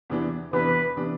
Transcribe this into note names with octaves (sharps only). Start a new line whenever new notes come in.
E2 C3 E3 B3 D4
E2 C3 E3 B3 D4 B4
C3 E3 B3 D4